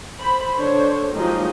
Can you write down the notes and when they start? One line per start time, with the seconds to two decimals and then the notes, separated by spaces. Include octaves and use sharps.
0.19 C5 B5
0.57 D3 D4 C5 C#5
1.13 F3 F#3 G#3 A#3 D#4 G4